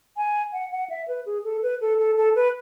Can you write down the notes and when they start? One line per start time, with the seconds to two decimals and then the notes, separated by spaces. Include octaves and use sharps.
0.17 G#5
0.53 F#5
0.72 F#5
0.90 E5
1.08 B4
1.26 G#4
1.44 A4
1.63 B4
1.81 A4
1.99 A4
2.17 A4
2.36 B4